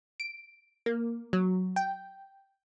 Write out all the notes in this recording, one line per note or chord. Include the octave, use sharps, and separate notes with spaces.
D7
A#3
F#3
G5